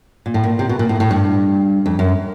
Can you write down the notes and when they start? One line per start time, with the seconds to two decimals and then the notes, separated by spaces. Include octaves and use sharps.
0.26 A#2
0.34 A2
0.44 A#2
0.59 C3
0.69 B2
0.79 A#2
0.89 A2
1.00 A2
1.11 G2
1.86 F2
1.99 F#2